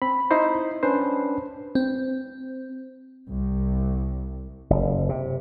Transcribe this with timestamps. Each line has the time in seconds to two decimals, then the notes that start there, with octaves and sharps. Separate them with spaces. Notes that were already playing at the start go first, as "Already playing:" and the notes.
0.02 C4 B5
0.31 D#4 E4 C5
0.83 C#4 D4 B4 C5
1.75 C4
3.30 C2
4.70 F#1
5.09 C3